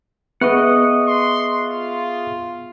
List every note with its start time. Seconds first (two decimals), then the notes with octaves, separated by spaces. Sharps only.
0.41 B3 G#4 D#5 E5 F#5 C#6
1.07 C6
1.59 F4